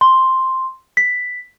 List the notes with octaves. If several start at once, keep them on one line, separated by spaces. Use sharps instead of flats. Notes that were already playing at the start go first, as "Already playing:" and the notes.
C6
B6